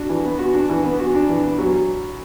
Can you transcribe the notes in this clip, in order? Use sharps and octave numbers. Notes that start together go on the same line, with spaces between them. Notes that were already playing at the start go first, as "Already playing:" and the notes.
Already playing: D4 F#4
E3
B3
F#4
D4
E3
B3
F#4
D4
E3
B3
F#3